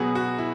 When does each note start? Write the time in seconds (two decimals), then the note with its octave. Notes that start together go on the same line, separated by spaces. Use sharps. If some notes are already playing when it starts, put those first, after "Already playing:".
Already playing: B2 F#3 B3 G#4
0.15 F#4
0.38 E4